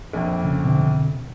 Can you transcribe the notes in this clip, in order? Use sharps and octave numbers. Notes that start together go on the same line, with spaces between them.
A#1 F2
C#3
B2 D3 C4